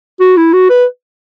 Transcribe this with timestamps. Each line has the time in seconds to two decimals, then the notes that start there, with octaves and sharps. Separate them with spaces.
0.20 F#4
0.37 E4
0.53 F#4
0.70 B4